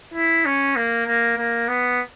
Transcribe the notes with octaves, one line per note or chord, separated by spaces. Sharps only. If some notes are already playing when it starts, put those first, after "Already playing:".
E4
C#4
A#3
A#3
A#3
B3